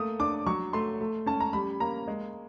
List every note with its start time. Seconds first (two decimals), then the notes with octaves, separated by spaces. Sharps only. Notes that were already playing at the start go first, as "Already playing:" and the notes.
Already playing: A3 A#3 D#6
0.19 D4 D6
0.46 F#3 C#6
0.73 A3 C6
1.01 A3
1.26 C#4 A5
1.40 A#5
1.53 G3 B5
1.80 A#3 A#5
2.08 G#3